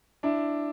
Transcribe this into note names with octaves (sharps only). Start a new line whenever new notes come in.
D4 E4